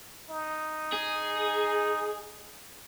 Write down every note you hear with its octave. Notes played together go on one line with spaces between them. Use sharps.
D#4
G#4